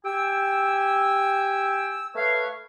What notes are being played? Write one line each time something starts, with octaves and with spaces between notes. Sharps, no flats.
G4 G5 G#5 E6
A3 B4 C#5 F5